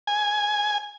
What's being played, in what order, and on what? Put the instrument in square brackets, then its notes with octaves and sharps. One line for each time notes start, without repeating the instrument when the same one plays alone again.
[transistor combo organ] G#5